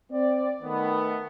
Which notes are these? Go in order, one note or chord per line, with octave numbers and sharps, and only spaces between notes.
C4 D5
D#3 A3 B3